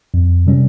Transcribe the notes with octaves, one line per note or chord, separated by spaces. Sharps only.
F2
C3 G3 C#4